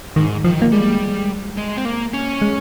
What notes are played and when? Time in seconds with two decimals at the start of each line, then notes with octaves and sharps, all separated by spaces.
0.16 G#2 D#3
0.44 D#3 F3
0.62 A#3
0.72 G3 G#3
1.57 G#3
1.77 C4
1.85 A#3
2.13 C#4
2.42 G#3